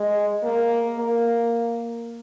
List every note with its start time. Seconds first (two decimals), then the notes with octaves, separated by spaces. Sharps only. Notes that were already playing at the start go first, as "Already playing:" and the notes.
Already playing: G#3
0.43 A#3
0.99 A#3